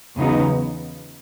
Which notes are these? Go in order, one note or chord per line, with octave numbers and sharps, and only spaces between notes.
E2 C#3 F#3 B3 D#4